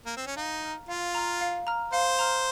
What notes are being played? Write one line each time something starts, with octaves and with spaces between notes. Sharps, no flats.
A#3
C4
C#4
D#4 F5
A#5 F6
F4 F5
A#5 F6
F5
A#5 F6
C5 F5
A#5 F6